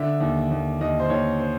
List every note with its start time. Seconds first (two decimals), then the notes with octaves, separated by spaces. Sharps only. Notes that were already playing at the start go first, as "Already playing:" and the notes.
Already playing: D3 E5
0.21 D#2
0.51 D#2
0.81 D#2 D#5
1.00 C5
1.10 D#2 C#5
1.39 C5